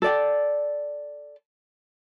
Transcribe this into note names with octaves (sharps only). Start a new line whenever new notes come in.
A4 D5 G5